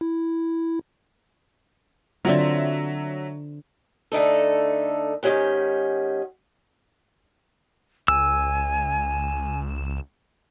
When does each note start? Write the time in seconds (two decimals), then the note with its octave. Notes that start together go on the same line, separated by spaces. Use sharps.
0.01 E4
2.25 D3 F#3 C4 F4 E5
4.12 D3 A3 D#4 A4
5.23 G#2 D#3 G#3 C#4 G4 F#5
8.08 C#2 G#5 E6